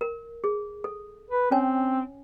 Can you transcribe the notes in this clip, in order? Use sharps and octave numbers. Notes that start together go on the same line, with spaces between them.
A#4
G#4
A4
B4
C4 C#4 C#5 G#5